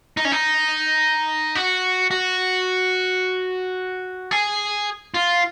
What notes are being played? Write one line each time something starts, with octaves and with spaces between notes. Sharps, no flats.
D#4
C#4
D#4
F#4
F#4
G#4
F4